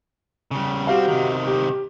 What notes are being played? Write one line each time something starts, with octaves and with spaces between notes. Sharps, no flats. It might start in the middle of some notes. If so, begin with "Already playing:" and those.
C#3 G3
G3 C4 F#4 G4 F5
C3 D#3
G4